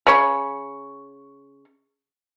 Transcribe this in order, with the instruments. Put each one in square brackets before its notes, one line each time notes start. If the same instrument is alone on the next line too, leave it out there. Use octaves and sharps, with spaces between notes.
[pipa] C#3 C#5